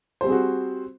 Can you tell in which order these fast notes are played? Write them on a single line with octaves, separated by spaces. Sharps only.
C5 G3 C4 G#4 F#4